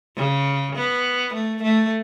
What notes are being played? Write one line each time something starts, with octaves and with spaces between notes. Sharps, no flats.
C#3
B3
A3
A3